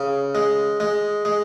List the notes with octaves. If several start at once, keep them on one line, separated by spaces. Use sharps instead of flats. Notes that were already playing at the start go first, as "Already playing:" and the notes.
Already playing: C#3
G#3
G#3
G#3